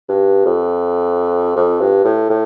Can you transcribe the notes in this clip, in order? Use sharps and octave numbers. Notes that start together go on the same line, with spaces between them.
G2
F2
F2
G2
A2
A2